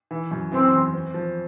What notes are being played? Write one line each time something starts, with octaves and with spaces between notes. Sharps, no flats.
E3
F#2
E3 C4
E2
C4
F3